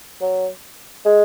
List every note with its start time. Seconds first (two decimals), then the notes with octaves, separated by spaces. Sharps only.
0.21 F#3
1.05 G#3